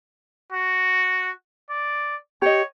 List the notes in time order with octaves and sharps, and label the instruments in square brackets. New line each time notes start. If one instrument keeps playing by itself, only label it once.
[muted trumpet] F#4
D5
[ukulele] G4 D#5 [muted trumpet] C#5